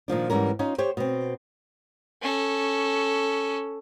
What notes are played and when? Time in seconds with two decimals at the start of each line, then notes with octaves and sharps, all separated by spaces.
0.08 A#2 D#3 F3 D4
0.30 G#2 E3 G3 C#4 A#4
0.59 C#4 D#4 F4
0.78 G4 C5 C#5
0.97 B2 C4
2.22 C#4 A4